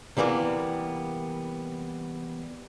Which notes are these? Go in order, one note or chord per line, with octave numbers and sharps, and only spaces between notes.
C3 E3 G3 A#3 B3